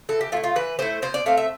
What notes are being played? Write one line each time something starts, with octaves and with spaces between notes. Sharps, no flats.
E3 A4
G4
A3 E4 F4
F4
E3 B4
A3 E4 C5
B2 C5
D5
A3 C4 F5
E5